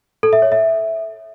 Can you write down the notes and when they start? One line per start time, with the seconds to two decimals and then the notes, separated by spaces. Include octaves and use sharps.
0.23 A4
0.33 E5
0.42 C#5
0.52 E5